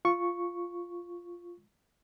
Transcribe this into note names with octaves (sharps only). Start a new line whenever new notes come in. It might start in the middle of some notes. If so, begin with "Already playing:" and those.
F4 C#6